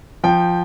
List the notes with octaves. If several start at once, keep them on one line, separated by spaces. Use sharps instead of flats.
F3 G5